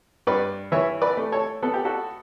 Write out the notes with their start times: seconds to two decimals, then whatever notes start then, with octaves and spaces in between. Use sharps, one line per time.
0.27 G2 B4 D5
0.72 E3 C#5 E5
1.02 B4 D5
1.17 A3
1.32 A4 C#5
1.62 B3 A4
1.74 G4
1.85 F#4 A4